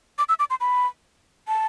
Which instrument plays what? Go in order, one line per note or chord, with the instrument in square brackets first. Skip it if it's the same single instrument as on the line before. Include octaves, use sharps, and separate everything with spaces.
[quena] D6
E6
D6
C6
B5
A5